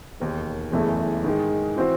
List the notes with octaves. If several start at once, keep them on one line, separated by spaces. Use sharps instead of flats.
E1 D#2 D#3
F#1 E2 C#3 E3 A3
G#2 D#3 G#3
E3 C4 F#4 C5